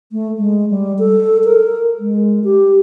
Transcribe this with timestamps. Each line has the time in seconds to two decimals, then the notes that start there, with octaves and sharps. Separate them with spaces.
0.12 A3
0.38 G#3
0.70 G3
0.99 A4
1.44 A#4
1.99 G#3
2.44 G4